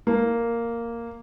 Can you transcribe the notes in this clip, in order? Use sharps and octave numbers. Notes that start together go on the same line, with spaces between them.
A#3